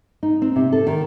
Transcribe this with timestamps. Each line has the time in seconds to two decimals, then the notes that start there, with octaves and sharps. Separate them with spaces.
0.23 D#4
0.42 C4
0.56 C3
0.72 A4
0.87 D#3